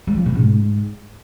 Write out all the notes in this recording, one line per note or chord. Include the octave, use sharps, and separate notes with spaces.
G3
F3
B2
G#2